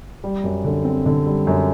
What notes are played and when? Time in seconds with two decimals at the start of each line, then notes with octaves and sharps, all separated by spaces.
0.24 G3
0.44 F#2
0.64 D3
0.85 C4
1.06 D3
1.26 G3
1.47 F#2